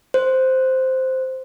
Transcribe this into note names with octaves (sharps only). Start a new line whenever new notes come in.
C5